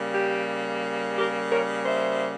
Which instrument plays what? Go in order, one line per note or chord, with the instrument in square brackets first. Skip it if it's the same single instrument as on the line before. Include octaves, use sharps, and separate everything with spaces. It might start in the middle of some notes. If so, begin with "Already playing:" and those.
Already playing: [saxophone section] C#3 G3 A#3
G4
G4 A#4
A#4 C#5
C5 E5